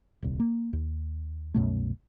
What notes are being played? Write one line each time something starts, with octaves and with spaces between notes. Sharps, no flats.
D#1 C2
A#3
D#2
C2 F#2 B2 A3